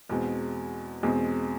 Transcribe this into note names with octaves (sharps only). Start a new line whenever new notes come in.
E2 B2 G#3 C4
E2 B2 G#3 C4